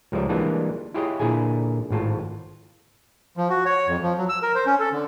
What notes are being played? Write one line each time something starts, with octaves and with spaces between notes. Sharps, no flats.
C#2 F3 G3 D5 E5
E3 G3 G#3 A#3 D4 F4
E4 F4 G4 G#4 C#5 D#5
A#2 D3 E4 G#4 G#5
G#1 A2 F4 A5
F3
F#4
C#5
F2
F3
F#3
E6
A#4
C5
C#4
A4
D3